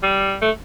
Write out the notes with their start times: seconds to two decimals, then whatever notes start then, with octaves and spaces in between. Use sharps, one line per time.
0.03 G3
0.42 A3